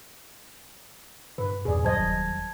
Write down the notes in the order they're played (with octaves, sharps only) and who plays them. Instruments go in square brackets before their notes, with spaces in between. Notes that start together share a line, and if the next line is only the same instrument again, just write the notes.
[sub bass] G2 [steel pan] B4
[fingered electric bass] E2 A#2 [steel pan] G#4 D5
[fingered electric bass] D#2 F#3 G3 [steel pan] C5 D#5 [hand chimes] A5 G#6
[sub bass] E1